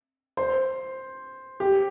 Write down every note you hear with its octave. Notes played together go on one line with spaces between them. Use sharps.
C5
G4